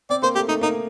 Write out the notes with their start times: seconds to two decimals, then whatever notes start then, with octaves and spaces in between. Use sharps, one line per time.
0.10 C4 D5
0.22 A#3 C5
0.35 A3 G4
0.49 A3 D#4
0.61 A#3 D#4